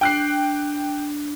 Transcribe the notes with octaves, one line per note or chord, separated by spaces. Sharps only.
D4 G5 F#6 C7